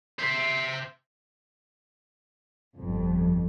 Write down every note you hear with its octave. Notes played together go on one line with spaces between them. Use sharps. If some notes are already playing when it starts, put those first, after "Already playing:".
C5 E5
G1 F2